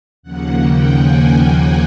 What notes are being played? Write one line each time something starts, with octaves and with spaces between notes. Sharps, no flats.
D#2 C#3 F3 A#3 F#5
G5
G#5